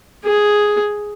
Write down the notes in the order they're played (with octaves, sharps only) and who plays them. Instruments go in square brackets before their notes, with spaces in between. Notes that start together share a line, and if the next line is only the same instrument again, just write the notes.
[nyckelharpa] G#4